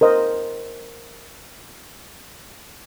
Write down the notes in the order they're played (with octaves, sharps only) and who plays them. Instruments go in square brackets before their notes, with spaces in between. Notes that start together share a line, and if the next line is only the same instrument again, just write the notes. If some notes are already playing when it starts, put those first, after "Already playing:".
[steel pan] A#4 C5 D#5